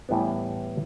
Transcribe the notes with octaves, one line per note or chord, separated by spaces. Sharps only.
A2 E3 G3 B3